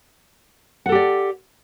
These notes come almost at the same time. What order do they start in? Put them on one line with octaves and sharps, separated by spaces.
F#5 A4 G4 D5